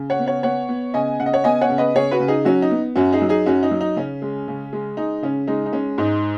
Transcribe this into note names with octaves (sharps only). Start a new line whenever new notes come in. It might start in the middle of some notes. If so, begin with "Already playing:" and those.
Already playing: C#3
C#5 F#5
B3
C#5 F#5
B3 C#5 F#5
B3
C#3 D#5 G#5
C#3 F#5
D#5
C#5 F#5
B3 D#5 G#5
C#5 F#5
C#3
B4 D#5
C#3 G#4 C#5
F#4 B4
C#3
D#4 G#4
F#3 C#4 F#4
D#4
B3
F#2 C#4 F#4
D#4 G#4
F#3
D#4 G#4
F#2 C#4 F#4
D#4
F#3
D#4
C#3 C#4
G#3
C#3
G#3
G#3 D#4
C#3 C#4
G#3 D#4
D#4
G#3 C#4
G#2 D#4